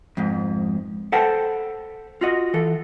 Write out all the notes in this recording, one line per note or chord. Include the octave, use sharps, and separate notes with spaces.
F2 G#2
A4 B4 C5 F#5 G5 A5
F4 F#4 D#5
E3 A4